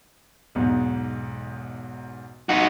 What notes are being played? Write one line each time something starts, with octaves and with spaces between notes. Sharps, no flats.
B1 E2 G#2
D#4 F#4